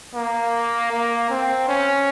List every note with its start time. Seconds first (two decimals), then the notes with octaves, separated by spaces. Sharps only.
0.14 A#3
0.91 A#3
1.30 C4
1.68 C#4